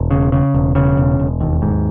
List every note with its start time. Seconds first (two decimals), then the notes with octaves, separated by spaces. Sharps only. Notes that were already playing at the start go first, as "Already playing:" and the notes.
Already playing: E1
0.11 C#3
0.32 C#3
0.54 E1
0.75 C#3
0.97 E1
1.20 E1
1.41 D#2
1.62 G#2